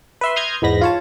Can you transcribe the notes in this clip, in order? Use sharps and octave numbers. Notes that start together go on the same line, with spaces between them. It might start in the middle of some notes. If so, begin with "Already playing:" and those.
B4 E5 C6
C6 D#6 F6 G6 G#6 A#6
E2 G#2 B3 B5 A#6
F4 C#5 A5